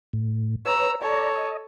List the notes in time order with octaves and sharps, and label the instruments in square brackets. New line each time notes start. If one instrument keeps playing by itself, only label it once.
[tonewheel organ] A2
[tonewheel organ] B4 C#5 [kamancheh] A#5 E6
[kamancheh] A4 C#5 [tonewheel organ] D5 A#5
[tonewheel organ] D#5